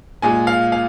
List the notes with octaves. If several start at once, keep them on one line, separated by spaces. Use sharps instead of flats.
A#2 G#3 G#5
F5
F5